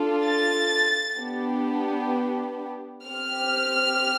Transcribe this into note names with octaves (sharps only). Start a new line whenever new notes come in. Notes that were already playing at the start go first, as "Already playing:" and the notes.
Already playing: D4 F4 A4
A6
B3 D4 G4
C4 G4 F6